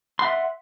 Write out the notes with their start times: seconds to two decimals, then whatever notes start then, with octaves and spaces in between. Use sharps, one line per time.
0.19 C6
0.22 F#5
0.25 E5